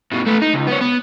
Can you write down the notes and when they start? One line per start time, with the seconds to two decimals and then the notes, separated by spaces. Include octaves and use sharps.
0.12 G2 B2
0.27 A3 B4
0.42 D#4
0.54 C#2
0.68 B3 C#4
0.81 B3